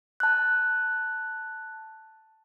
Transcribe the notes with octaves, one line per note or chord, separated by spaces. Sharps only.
A5 F#6